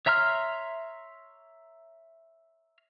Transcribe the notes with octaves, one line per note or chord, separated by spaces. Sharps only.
C#5 E5 A#5 C6 F6